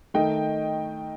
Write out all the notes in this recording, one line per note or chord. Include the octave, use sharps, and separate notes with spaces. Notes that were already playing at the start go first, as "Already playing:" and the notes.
D#3 A3 D#4 D#5 G5